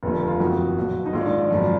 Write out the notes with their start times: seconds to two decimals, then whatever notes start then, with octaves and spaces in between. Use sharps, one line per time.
0.03 F1 D#2 D3 F3
0.28 F4
0.40 F#1 F2 D#3 F#4
0.77 B1 A#2 F3
1.06 D#4
1.13 A#1 G#2 D#3 F4
1.21 D4
1.26 D#4
1.38 D4
1.50 G#1 F#2 F3